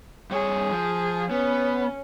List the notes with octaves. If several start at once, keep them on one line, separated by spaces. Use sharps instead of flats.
G2 G#4 C#5
F3
B3 C#4